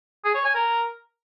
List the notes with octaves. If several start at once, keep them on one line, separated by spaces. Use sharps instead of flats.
G#4
C#5
G#5
A#4